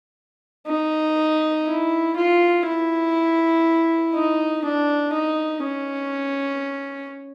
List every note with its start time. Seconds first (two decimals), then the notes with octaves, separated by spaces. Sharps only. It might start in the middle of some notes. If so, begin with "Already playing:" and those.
0.67 D#4
1.67 E4
2.16 F4
2.66 E4
4.15 D#4
4.65 D4
5.13 D#4
5.64 C#4